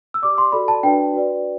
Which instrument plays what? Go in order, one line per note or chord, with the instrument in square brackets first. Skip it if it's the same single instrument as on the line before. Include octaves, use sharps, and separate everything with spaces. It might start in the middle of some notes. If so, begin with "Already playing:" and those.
[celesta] E6
G4 D5 D6
C6
F#4 A4 D5 B5
A5
D4 F#4 B4 D5 G5
F#4 B4 D5